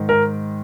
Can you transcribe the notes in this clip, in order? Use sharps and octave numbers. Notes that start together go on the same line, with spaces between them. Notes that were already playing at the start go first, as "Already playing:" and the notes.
Already playing: G#2 D#3
A#4